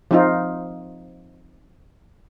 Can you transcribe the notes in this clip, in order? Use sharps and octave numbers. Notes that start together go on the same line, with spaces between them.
F3 C4 D#4 F4